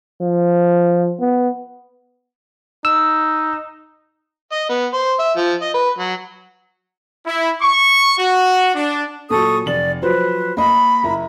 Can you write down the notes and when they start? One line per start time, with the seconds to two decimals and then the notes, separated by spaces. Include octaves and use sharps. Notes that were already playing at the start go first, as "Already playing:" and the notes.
0.21 F3
1.20 B3
2.85 D#4 E6
4.52 D#5
4.70 B3
4.93 C5
5.19 E5
5.37 F3
5.62 D#5
5.74 B4
5.98 F#3
7.26 E4
7.61 C#6
8.18 F#4
8.75 D4
9.30 A#2 F#3 A4 C#6 D#6
9.66 F1 D5 F#7
10.02 F3 F#3 B4 C5
10.57 A#3 D#5 B5
11.03 F#1 E4 A#5